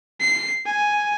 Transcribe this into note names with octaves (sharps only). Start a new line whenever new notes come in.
C7
G#5